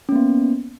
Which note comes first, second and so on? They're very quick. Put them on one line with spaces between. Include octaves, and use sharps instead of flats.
C#4 A#3 B3